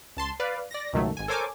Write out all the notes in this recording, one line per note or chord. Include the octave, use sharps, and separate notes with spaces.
C#2 A5 C6
B4 D5 F5
D5 A#6
C#2 F#2 B2 D#3 F#3 A3
G#1 G#5
A4 A#4 C5 C#5 G#5 D6